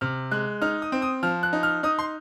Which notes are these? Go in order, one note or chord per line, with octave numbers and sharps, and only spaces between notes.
C3 F6
G#3 F#6
D#4 F6
D#6
C4
D#6
F3 F6
F#6
D#4
F6
D#4 D#6
C6